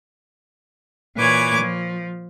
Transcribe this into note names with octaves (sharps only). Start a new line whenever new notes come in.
A#2 E3 B4 C#5 D6 G#6
F3